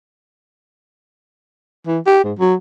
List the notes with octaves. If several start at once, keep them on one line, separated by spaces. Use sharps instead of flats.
E3
G4
G#2
F#3